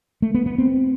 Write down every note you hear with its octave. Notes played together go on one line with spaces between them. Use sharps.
A3
B3
B3
C4